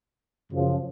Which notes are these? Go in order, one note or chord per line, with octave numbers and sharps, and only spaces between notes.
F#2 C#3 F3